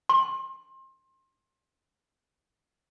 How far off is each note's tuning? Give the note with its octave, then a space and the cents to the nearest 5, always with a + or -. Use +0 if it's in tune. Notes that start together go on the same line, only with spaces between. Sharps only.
C6 +30